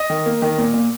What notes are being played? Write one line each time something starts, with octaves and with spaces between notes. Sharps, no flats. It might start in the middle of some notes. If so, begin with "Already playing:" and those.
Already playing: D#5
D#3
A#3
D#3
A#2
A#2